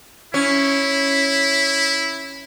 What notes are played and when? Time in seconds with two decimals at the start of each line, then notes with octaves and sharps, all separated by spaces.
0.34 C#4 E4